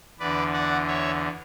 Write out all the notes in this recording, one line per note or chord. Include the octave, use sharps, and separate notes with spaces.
E2 D3 B4 D5
D5 F#5
C#5 E5